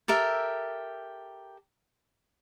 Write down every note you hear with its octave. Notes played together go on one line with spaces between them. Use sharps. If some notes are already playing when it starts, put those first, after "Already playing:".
G4 A4 A#4 E5